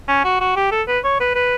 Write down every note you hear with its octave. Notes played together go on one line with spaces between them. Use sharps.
C#4
F#4
F#4
G4
A4
B4
C#5
B4
B4